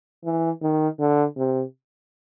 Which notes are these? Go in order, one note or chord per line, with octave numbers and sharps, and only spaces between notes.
E3
D#3
D3
C3